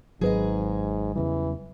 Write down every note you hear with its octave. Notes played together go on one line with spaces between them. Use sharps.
G#1 G#2 F#3 G#4 B4 D#5
E2 C#3 E3 G3